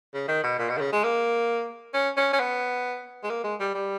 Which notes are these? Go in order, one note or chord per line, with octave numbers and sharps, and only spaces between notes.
C#3
D#3
B2
A#2
B2
D#3
C#3
G#3
A#3
C#4
C#4
C#4
B3
G#3
A#3
G#3
G3
G3